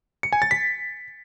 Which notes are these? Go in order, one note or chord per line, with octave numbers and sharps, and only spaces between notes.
C#7
G#5
A6
B6